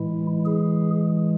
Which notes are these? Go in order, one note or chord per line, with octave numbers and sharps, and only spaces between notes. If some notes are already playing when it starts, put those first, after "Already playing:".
Already playing: A2 E3 G#3 E4
G#4